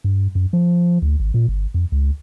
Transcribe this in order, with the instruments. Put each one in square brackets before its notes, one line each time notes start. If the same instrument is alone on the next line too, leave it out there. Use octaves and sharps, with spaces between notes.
[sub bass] G2
F#2
F3
D2
G#1
A#2
G1
F2
C#2